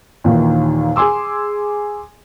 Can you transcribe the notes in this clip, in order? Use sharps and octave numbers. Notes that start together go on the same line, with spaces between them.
D#2 A#2 D#3 E3
G#4 G#5 C6 D6 E6